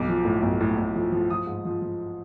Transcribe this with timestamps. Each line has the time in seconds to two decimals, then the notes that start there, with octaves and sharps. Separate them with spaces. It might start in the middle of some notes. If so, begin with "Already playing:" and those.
Already playing: B1 D6
0.08 F3
0.25 A2
0.42 B1
0.60 A2
0.78 A2
0.96 F3
1.12 F3
1.30 F3 D#6
1.47 G#2
1.65 F3
1.82 F3